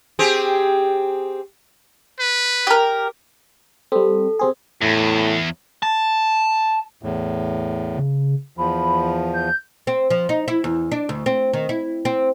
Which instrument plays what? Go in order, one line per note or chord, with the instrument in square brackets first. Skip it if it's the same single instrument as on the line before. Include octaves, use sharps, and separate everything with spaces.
[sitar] C4 G4 G#4
[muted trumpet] B4
[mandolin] G4 A#4
[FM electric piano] G3 C4 [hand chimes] A4
[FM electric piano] C3 C4 G#4
[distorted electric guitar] E2 [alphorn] A2
[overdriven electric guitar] A5
[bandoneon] E2 A2
[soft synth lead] C#3
[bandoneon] E2 F3 [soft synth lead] B5
[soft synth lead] G6
[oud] C4
F3
D#4
E4
E2
D4
D2
C4
D#3
E4
C4